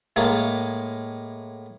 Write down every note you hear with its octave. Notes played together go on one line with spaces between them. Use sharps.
A2 G#3 A#3